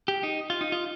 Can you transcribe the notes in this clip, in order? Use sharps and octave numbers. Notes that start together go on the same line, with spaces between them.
G4
D#4
F4
D#4
F4